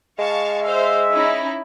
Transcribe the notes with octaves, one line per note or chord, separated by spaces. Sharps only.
G#3 F5 A5 C#6
C5 E5 F5
C#4 D#4 E4